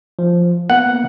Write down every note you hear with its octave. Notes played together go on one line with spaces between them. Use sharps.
F3
A#3 B3 F#5